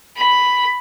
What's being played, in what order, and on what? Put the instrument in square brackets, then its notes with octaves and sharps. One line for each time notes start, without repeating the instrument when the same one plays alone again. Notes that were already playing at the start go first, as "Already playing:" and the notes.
[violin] B5